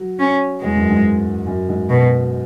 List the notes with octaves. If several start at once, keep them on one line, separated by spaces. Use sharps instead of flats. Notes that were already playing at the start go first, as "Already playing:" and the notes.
Already playing: F#3
C#4
E2 G#3
F#2
G#2
F#2
G#2
B2